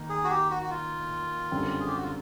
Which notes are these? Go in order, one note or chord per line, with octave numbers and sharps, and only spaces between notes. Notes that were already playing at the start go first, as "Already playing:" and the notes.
Already playing: D#3 A#3 D#4
G#4
F#4
G4
F#4
F#4
F4
F#2 D3 G3 C4
G#4
G4
F#4
F4